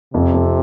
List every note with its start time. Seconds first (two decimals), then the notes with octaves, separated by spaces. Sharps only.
0.14 F2 C3
0.34 F2